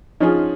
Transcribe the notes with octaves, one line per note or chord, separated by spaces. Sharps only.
F3 C#4 D#4 F4 G#4